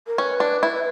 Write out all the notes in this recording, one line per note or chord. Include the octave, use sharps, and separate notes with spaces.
A#4
C#4 B4
D4
E4